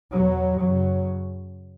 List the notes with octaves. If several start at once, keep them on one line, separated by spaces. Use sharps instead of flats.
E2 B2 F#3
F#2 C#3 F#3